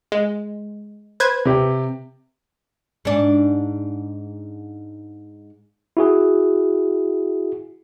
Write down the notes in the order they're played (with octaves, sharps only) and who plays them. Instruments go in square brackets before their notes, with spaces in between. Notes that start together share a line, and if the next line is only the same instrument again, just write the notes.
[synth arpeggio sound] G#3
B4 C5 G#6
[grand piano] C3 G4
[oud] G#2 D4
[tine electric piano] E4 F#4 G#4